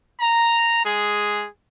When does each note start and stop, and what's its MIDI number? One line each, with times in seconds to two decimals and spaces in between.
0.20 0.81 82
0.85 1.47 56
0.85 1.47 68